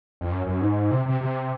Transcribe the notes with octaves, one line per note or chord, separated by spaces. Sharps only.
F2
F#2
F#2
G#2
C3
C3
C3